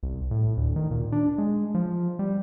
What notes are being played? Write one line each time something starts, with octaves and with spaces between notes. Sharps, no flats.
C2
A2
D2
D#3
A#2
D4
G#3
F3
G3